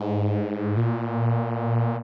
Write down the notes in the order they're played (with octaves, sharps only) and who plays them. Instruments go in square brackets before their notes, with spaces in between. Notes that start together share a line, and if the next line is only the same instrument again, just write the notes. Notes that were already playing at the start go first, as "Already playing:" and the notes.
Already playing: [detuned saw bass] G#2
A#2